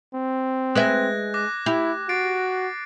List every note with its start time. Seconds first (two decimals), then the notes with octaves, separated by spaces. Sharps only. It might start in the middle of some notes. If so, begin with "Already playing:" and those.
0.14 C4
0.75 G#3 B4 E5 F#6 G#6 A#6
1.34 D6 F#6 A#6
1.66 E4 G4
2.09 F#4 A6 C7 D7